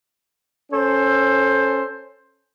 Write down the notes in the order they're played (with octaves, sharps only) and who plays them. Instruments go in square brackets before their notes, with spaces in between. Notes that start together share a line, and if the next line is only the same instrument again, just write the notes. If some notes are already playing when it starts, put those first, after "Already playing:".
[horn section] C#4 A4 C5